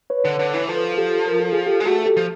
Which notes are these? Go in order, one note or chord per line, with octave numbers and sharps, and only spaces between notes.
B4 C#5
D3
D3
E3
F3 A4 B4
G4 A4
A#4
A4
G#4
G4 A4
G#3
A3 F#4 G#4
G4 A4
F3